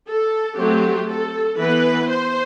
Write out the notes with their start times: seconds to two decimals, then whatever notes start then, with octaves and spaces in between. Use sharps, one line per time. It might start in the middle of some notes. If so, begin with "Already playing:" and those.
0.09 A4
0.58 F#3 A3 C4 G4
1.09 A4
1.59 E3 B3 B4
2.10 C5